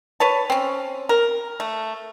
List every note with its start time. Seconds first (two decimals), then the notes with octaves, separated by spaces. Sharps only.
0.20 B4 C#5 A5
0.50 C4 C#4
1.09 A#4
1.60 A3